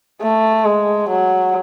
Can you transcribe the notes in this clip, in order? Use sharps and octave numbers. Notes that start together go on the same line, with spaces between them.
A3
G#3
F#3